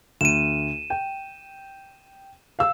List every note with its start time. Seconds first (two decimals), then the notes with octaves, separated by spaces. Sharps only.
0.21 D2 D#7 E7
0.90 G5
2.59 F5 E6